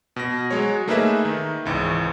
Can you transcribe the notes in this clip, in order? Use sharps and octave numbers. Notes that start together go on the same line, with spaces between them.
B2 A#6
F#3 G#3 C#5
A3 A#3 D#4 G#4 B4 E5
D#3
G#1 C#2 E3